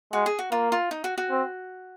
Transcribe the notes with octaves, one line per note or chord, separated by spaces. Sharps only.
G#3 F#4
G#4
F#4
A#3 F4
F4
D#4
F#4
F#4
C4